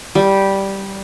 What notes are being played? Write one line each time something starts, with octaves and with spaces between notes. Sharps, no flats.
G3